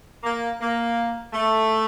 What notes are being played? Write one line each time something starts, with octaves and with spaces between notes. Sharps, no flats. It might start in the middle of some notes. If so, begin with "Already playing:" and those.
A#3
A#3
A3